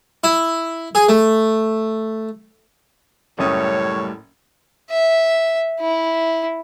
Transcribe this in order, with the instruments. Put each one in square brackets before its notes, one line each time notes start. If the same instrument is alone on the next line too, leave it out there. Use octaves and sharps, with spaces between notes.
[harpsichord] E4
G#4
A3
[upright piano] F#1 C#4 D#6 [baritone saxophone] A2 [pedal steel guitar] G3 A3 [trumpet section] C#5
[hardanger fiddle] E5
E4